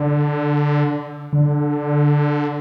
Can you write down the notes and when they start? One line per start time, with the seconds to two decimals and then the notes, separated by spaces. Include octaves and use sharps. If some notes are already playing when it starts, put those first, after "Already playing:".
Already playing: D3
1.33 D3